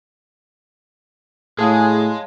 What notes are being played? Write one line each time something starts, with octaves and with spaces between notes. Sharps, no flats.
A2 G#3 G#4 C#5 F5 A5